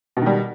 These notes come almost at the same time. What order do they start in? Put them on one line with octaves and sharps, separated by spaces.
B2 D#3 G3